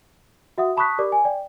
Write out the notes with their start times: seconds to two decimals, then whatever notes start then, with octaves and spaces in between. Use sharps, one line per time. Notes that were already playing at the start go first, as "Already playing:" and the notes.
0.58 F#4 E5 F#5 D#6
0.77 A5 B5 C#6 D#6 F#6 B6
0.98 G4 A#4 D5 D6
1.12 G#5
1.25 D5 G5